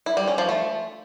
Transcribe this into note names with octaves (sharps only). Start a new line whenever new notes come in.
E4
G3
C#4
F3
A3